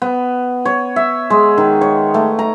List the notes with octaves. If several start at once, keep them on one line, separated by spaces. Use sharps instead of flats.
B3
C#5
E5
G#3
D#3
C#5
A3
A#5